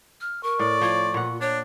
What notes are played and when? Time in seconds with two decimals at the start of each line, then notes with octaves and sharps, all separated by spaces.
0.21 F6
0.43 A#4 C#6
0.59 A2 D5
0.81 F3 F4 C#5
1.14 A#2 F#5
1.41 D4 C#5